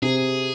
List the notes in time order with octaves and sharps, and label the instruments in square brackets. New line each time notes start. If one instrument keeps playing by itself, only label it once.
[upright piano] C3 [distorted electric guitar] G#4